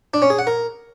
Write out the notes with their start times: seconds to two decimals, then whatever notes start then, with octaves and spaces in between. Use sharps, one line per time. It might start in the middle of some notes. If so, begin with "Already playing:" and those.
0.14 D4
0.22 C#4
0.30 G#4
0.39 F#5
0.47 A#4